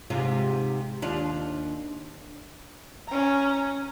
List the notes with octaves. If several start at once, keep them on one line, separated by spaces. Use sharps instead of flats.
G#2 C3 F4
D#2 D4 F4
C#4 A#5